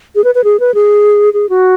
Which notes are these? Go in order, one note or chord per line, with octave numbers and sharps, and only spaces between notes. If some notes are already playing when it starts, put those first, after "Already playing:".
G#4
B4
B4
G#4
B4
G#4
G#4
F#4